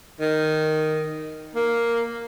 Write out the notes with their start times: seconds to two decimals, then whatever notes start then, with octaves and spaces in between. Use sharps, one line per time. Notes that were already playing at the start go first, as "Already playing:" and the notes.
0.20 D#3
1.55 A#3